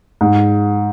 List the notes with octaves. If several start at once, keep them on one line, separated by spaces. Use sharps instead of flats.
G#2